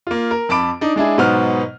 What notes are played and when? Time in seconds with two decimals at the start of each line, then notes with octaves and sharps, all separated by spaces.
0.07 A#3 F4
0.31 A#4
0.49 F2 A5 B5 D6 D7
0.81 D4 D#4
0.96 G#3 D4 E4 G#4
1.18 G#2 B2 F#3 B3 C5 F6